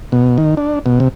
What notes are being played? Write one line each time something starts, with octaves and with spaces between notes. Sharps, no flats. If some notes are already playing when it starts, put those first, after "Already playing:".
B2
D#3
D4
B2
C3